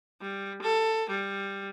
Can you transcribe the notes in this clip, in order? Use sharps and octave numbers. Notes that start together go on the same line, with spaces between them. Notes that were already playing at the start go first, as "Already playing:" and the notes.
G3
A4
G3